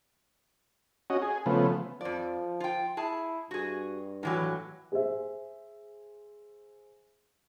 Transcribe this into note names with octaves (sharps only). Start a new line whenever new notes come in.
C#4 F#4 D#5
G#4
C#3 F3 A3 B3
F2 F3 D5
F4 G5
E4 G#4 A5
G2 F#4 G#4
A2 E3 F#3
G#4 C5 E5